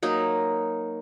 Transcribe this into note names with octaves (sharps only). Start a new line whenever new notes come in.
F#3 A#3 D#4